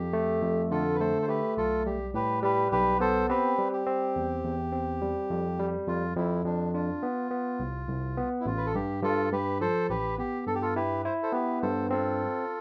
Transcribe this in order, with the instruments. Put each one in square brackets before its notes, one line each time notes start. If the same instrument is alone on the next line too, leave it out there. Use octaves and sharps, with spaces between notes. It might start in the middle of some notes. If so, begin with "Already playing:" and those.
Already playing: [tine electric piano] F2 [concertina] G4
[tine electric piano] A3
F2
[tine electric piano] D3 [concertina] F4 A4
[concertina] B4
[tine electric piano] A3 [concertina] A4 C5
[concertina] C5
[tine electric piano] A3 [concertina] G4 B4
[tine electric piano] B1 [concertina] F4 A4
[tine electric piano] G3 [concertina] G4
[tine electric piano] A2 [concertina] G4 B4
[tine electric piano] G3 [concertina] G4 B4
[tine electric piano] B1 [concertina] G4 B4
[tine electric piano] B3 [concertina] A4 C5
[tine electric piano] C4 [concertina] G4 B4
[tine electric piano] G3
[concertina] G4
[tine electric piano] C4
E2
E2
C4
G3
F2
G3
[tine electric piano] F2 [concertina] F4
[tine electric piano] F2 [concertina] E4
[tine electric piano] F2 [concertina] D4
[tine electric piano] D4 [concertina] F4
[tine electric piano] B3
B3
C2
C2
B3
[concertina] E4
[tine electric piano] A1 [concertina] F4
[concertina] B4
A4
[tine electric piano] G2 [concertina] G4
[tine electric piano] G2 [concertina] F4 A4
[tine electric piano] G2 [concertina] G4 B4
[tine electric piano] F3 [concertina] A4 C5
[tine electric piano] A1 [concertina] G4 B4
[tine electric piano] B3 [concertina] G4
[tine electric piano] G2 [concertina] A4
[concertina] G4
F4 A4
[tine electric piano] E4 [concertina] G4 B4
[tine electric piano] E4 [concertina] C5
[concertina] A4 C5
[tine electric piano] B3 [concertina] G4 B4
[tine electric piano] G2 [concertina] A4 C5
[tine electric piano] C4 [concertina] F4 A4